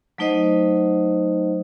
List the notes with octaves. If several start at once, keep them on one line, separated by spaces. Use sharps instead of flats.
F#3 A3 D#4 C5 D#5 F#5